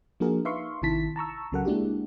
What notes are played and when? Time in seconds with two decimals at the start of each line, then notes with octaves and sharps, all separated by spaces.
0.20 F3 A#3 D4 F#4 G#4 A#4
0.45 D#4 B4 E5 F5 C6 C#6
0.82 A1 C3 D#3 E4 A5 B6
1.16 A5 A#5 C#6 E6
1.52 C#2 C#3 F#3 A4 A#4 F#5
1.65 G#3 A#3 D4 E4 F#4 G4